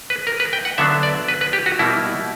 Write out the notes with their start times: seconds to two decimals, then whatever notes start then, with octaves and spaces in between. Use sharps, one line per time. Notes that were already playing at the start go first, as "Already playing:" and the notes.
0.10 B4
0.27 A#4
0.40 B4
0.53 G5
0.65 F#5
0.78 D3 F#3 B3 D4 E5
1.03 D5
1.28 B4
1.41 B4
1.53 G4
1.66 F#4
1.79 B2 G3 A#3 E4